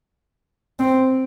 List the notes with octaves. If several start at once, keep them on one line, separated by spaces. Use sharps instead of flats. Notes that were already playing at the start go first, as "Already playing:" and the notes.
C4